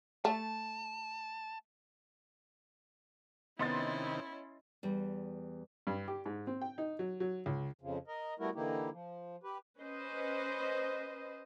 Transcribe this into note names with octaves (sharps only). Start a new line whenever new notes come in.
A3 A5
C3 D#3 B3 C#4 E4 D#5 C6 A6
E2 G3
G2
G4
G#2
C4
G5
D#4
F#3
F#3
C#2
F2 C#3 F3
A#4 D#5
G3 A3 B3 E4 F#4 A#4
D3 E3 A#3 D#4 E4 G4
F3
G4 B4
C#4 B4 C5 D#5